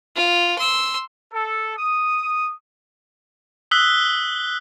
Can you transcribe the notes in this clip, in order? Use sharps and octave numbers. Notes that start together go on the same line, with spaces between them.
F4
C6 E6
A4
D#6
D#6 E6 F#6 B6 G7